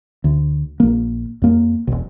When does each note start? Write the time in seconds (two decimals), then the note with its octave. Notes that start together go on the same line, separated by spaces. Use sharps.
0.24 D2
0.80 A#1 A#3
1.42 F2 A#3
1.87 E1 B1